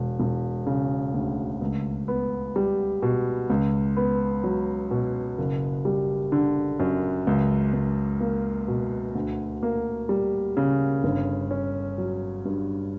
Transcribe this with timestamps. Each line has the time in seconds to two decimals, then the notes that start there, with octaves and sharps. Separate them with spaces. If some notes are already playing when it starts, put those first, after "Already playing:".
Already playing: E1
0.20 E1
0.66 C#3
1.14 D2
1.61 C#2
2.08 B3
2.56 G3
3.02 B2
3.50 C#2
3.97 B3
4.44 F#3
4.91 B2
5.38 F#1
5.85 G3
6.32 D3
6.80 F#2
7.27 C#2
7.73 C#2
8.20 A#3
8.68 B2
9.15 D2
9.63 A#3
10.09 G3
10.57 C#3
11.04 G1
11.51 C#4
11.98 F#3
12.45 G2